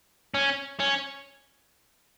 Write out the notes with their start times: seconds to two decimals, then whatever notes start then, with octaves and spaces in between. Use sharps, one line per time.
0.34 C#4
0.80 C#4